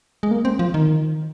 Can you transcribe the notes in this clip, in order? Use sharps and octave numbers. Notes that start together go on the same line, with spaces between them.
G#3
A#3
C4
F3
D#3